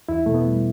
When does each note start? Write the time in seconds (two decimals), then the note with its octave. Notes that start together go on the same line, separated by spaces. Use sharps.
0.09 E2 E4
0.26 B2 A3
0.35 B3
0.47 G3